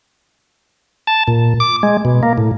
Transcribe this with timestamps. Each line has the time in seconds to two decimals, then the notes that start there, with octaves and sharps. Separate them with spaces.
1.07 A5
1.28 A#2
1.60 D6
1.83 G#3
2.05 B2
2.23 A#3
2.38 A2